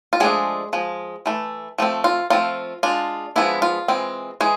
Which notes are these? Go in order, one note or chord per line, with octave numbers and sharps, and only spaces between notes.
F4
F3 G#3 A3 D4 G#4
F3 G#3
E3 A3
F3 A3 C4
F4
F3 A3 C4 F4
G#3 D4 F4
F3 G#3 B3 D4 E4
F4
E3 G#3 C4
E3 G#3 G#4